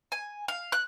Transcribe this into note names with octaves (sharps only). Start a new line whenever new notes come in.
G#5
F5
F#6